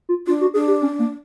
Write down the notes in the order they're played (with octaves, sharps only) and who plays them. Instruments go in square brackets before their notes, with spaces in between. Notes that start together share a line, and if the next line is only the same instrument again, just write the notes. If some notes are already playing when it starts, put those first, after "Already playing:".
[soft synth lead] F4
[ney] D4 [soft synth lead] F4
[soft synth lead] F#4
[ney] D4 [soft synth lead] G#4
[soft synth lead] G4
C#4
A#3